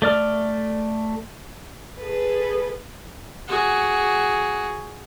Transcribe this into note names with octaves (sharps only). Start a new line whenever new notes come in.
A3 D5 F6
G#4 A4 B4
F#4 G#4